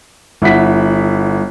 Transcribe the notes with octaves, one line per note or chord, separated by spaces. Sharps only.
G1 E4 F#5 B6